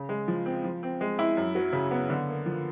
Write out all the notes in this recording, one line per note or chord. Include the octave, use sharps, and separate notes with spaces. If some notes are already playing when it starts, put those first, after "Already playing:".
Already playing: C#3
G#3
F3
C4
F3
C4
G#3
E4
F#2
F#3
C#3
B3
D3
A#3
F3